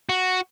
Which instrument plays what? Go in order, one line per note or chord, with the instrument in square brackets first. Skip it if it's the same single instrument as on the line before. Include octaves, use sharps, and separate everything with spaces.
[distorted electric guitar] F#4